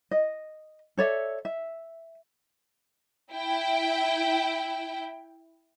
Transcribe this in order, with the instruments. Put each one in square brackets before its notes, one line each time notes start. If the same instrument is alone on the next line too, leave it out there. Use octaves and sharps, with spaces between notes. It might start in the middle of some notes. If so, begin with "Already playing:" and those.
[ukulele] D#5
A4 C#5 D5 E5
E5
[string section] E4 G5